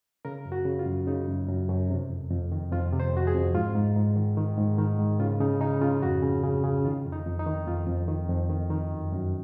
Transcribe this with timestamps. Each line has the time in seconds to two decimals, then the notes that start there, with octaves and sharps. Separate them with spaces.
0.25 C#3 A#4
0.45 F#2
0.52 F#4
0.65 C#3
0.79 F4
0.86 F#2
1.07 C#3 D#4
1.28 F#2
1.49 F#2
1.69 F#2
1.90 C3
2.10 F2
2.31 F2
2.52 D#3
2.72 F2 F4
2.93 C3
3.00 C5
3.13 F2 F#4
3.27 G#4
3.34 F2
3.54 G#2 F4
3.75 G#2
3.96 G#2
4.16 D#3
4.37 D#3
4.57 G#2
4.78 D#3
4.99 G#2
5.19 C#3 F4
5.40 C#3 D#4
5.61 C#3 D#4
5.81 C#3 F4
6.02 F2 F#4
6.22 C#3
6.43 C#3
6.64 C#3
6.85 D#3 F4
7.05 F2
7.12 D#4
7.26 F2
7.39 D#4
7.47 D#3
7.67 F2 F4
7.87 F2
8.08 D#3
8.29 F2
8.50 D#3
8.70 D#3
8.91 F#2
9.12 F#2